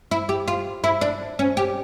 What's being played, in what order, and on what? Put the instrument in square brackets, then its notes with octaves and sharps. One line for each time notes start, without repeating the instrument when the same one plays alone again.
[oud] E4
G4
F4
E4
D4
C#4
G4